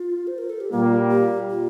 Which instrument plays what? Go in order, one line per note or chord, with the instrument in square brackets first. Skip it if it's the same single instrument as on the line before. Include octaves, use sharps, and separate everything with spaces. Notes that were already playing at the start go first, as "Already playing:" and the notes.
Already playing: [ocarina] F4
C5
A#4
A4
G4
[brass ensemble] A#2 G3 A#3 [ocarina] F4
[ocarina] G4
F4